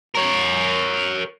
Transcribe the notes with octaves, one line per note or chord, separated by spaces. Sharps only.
A#4 C#5